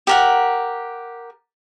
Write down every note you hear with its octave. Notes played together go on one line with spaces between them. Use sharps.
G4 A#4 F#5